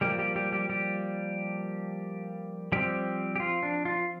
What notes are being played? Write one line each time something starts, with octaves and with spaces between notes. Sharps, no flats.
F3 G3 A#3 G4
G3 G4
G3 G4
G3 G4
G3 G4
F3 G3 C4 G4
G4
F4
D4
F4